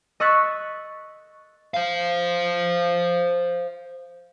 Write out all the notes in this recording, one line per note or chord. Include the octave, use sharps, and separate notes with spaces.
D#5 C#6 E6 F#6 A6 B6
C5 F5